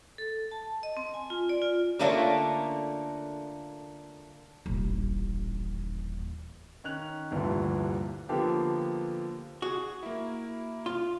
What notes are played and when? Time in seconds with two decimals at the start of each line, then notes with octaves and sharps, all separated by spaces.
0.18 A4
0.51 A5
0.83 D#5
0.97 C4
1.14 G#5
1.30 F4
1.49 D5
1.62 F4
1.99 D3 A3 A#3 C#4 D4 F4
4.66 D#1 A1
6.84 D#3 C#4 F#6 F7
7.31 F1 D2 G2 A#2 D3 E3
8.29 D3 F3 A#3 B3 G4 A4
9.62 F#4 G#4
10.03 A#3 E4
10.86 F4